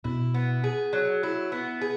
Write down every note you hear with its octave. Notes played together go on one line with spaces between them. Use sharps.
B2 E4
B3
G#4
F#3
E4
B3
G#4